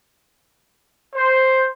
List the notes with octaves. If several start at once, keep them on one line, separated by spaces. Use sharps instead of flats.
C5